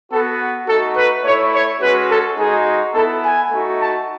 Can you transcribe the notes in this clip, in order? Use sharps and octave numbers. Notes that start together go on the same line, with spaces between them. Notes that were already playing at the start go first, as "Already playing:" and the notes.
B3 F#4 A4
A3 D#4 F#4 A4
B4
A3 E4 C#5
C#5
G#3 C#4 F#4 B4
A4
G#3 D#4 F#4 G#4
B3 E4 A4
G#5
A3 D#4 F#4
A5